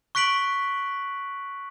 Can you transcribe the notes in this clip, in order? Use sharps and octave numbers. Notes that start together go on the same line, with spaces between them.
C#6 F#6 B6 D7 F#7